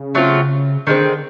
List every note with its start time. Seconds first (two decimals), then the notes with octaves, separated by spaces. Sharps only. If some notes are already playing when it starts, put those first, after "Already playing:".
Already playing: C#3
0.15 F#3 A3 C4 F4
0.87 D3 D#3 G#3 C4